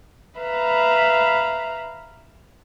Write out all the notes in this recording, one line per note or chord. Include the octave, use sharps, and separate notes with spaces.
B4 E5 F5 A#5 B5